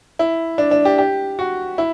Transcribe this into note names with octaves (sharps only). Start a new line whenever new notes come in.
E4
D4
D4
G4
G4
F#4
E4